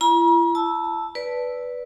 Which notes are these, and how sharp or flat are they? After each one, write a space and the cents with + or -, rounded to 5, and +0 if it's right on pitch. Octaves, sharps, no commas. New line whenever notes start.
E4 +45 A#5 +45
A5 +0 E6 +0
B4 +0 D5 -10